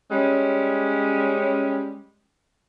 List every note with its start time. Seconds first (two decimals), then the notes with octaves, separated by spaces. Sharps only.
0.11 G3 G#3 C#4